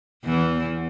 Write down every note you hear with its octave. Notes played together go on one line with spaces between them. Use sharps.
E2 E3